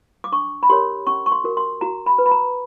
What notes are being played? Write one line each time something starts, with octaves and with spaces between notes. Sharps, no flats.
D6
D4 C#6
B5
G4 A#4 C#5 C6
C#4 C#6
C#6
C6
F#4 A#4
C6
F#4 A#5
B5
B4
B5
A#5